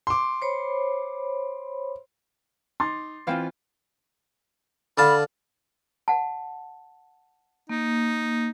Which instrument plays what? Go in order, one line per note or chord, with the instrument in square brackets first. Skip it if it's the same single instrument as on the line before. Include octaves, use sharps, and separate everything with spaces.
[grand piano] C6 D6
[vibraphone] C5 C#5 B5
[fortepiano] D#4 [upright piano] C6 D6 A6
[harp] E3 C4 F4 [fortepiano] B4 F5 G5
[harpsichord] D3 F5 A5 [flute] B5
[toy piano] F#5 A5
[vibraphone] A#3 [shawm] D#4